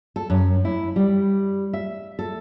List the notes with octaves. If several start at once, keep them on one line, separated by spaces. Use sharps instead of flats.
A4
F#2
E4
G3
E5
A4